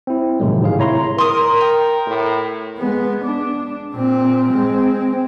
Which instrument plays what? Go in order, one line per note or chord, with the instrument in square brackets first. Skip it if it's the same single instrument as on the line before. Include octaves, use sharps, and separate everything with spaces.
[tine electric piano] C4 E4
A#1 A2 C3 D#3 F#3 G#3
G#2 D3 G#4 F5
E4 C#5 A#5 C6
[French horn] A#4 [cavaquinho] C6 D#6
[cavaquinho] G5
[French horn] A2
[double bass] G#3 B3
D4
A#2 C4
G#3 C4